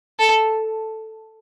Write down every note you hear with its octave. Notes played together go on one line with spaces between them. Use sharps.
A4